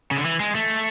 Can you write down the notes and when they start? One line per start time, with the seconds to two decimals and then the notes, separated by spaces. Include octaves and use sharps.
0.11 C#3
0.18 D3
0.25 E3
0.40 G#3
0.55 A3